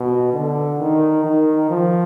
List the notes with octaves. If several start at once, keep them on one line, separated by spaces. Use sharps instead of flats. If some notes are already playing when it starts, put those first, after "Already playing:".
Already playing: B2
D3
D#3
D#3
F3